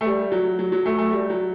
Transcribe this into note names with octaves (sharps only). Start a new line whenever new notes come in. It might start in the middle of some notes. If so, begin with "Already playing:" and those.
A3
G3
F#3
F#3
F#3
A3
A3
G3
F#3